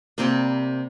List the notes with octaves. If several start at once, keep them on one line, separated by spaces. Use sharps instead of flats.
C3 G3 A#3 C5